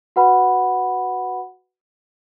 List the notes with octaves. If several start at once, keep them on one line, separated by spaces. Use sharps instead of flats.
F#4 B4 F#5 B5